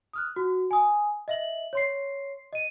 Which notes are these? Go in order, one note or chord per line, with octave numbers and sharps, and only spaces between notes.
D#6 F6 F#6
F#4
G#5 D#6
D#5 E5 F#7
C#5 C6 C7
D#5 D#7